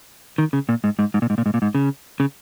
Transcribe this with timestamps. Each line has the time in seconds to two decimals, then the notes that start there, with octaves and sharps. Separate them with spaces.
0.38 D#3
0.53 C#3
0.69 A#2
0.84 G#2
0.99 G#2
1.14 G#2
1.22 A#2
1.30 G#2
1.38 A#2
1.46 G#2
1.54 A#2
1.62 G#2
1.75 C#3
2.20 C#3